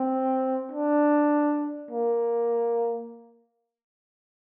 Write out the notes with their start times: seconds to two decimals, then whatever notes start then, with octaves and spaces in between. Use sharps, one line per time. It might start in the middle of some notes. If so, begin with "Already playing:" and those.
Already playing: C4
0.71 D4
1.91 A#3